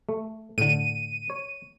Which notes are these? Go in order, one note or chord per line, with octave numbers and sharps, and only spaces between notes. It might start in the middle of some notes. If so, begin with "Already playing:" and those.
A3
A2 D3 D#7
C#5